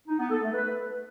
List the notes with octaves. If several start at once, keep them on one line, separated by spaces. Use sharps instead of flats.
D#4
B3
A4
A3
B4